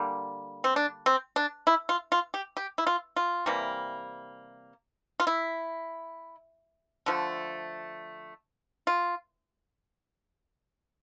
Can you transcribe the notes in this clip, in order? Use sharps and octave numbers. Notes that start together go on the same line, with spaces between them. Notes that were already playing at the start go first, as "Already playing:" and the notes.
Already playing: D3 G3 A#3
C4
D4
C4
D4
E4
F4
F4
G4
G4
E4
F4
F4
C3 E3 G3 A#3
F4
E4
D3 F3 A3
F4